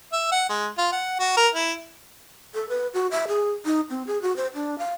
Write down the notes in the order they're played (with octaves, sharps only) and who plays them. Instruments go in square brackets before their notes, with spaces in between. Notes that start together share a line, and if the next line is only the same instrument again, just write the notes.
[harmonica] E5
F#5
G#3
F4
F#5
F#4
A#4
E4
[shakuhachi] A4
B4
F#4
E5
G#4
D#4
C4
G#4
F#4
C5
D4
F5